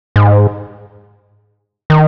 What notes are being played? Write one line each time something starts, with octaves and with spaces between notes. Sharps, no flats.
G#2
D#3